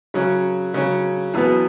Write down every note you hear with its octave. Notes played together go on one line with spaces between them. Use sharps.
C#3 F#3 C#4
C#3 F#3 C#4
E2 B2 F#3 B3